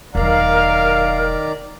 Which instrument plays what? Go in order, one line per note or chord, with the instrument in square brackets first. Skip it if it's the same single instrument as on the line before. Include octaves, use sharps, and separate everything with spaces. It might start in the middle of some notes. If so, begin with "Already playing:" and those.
[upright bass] E1 F#3 [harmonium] D#3 D5 A#5 [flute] A#4 [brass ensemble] F5